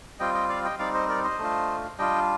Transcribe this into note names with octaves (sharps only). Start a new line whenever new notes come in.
G3 C4 F4 D#5 G5
D#5 G5
D5 F5
D#5 G5
G3 C4 D#4 D5 F5
C5 D#5
A#4 D5
C5 D#5
A3 D4 F4
G3 D4 F4 D#5 G5